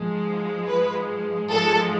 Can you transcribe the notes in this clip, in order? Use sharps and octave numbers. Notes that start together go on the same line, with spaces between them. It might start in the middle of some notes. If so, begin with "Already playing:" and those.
Already playing: G#2 F3 G#3
B4
G#2 F3 G#3 A4